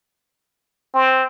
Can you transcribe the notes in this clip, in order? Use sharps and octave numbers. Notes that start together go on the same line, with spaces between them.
C4